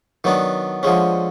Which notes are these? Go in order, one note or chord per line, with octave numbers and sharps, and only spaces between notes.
D#3 F#3 B3 D4
D3 F3 G#3 C#4